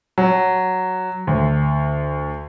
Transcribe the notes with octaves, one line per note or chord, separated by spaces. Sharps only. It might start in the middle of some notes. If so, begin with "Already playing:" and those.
F#3
D2